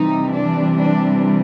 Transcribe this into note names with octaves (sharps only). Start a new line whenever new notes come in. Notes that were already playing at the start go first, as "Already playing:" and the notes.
Already playing: C3 E3 G3 D#4
D4
D4